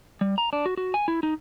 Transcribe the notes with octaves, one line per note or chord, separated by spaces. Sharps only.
G3
A#5
D4
F#4
F#4
G#5
E4
D#4